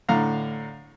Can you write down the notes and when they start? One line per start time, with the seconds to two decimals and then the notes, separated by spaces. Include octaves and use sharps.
0.09 A2 D3 F5 A#5